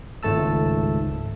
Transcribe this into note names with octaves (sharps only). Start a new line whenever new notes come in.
G#1 C#2 G#2 A3 A5 E6